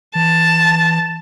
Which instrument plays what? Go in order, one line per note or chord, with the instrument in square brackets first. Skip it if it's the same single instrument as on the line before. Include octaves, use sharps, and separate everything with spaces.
[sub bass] E3 [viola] A5